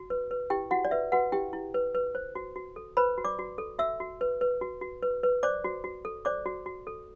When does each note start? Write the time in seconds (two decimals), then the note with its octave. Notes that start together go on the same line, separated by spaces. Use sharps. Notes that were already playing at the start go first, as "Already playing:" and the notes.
Already playing: F#4
0.10 B4
0.31 B4
0.50 E4 G4 G5
0.71 E4 F#4 F#5
0.85 D5
0.91 B4 E5
1.12 F#4 B4 F#5
1.32 E4 G4 G5
1.53 E4
1.74 B4
1.95 B4
2.15 C5
2.35 F#4
2.56 F#4
2.76 A4
2.97 B4 C5 B5
3.18 F#4
3.25 D5 D6
3.39 F#4
3.58 A4
3.79 F#4 E5 E6
4.00 F#4
4.21 B4
4.41 B4
4.61 F#4
4.81 F#4
5.03 B4
5.23 B4
5.43 C5 D5 D6
5.64 F#4
5.84 F#4
6.05 A4
6.25 C5 D5 D6
6.46 F#4
6.66 F#4
6.87 A4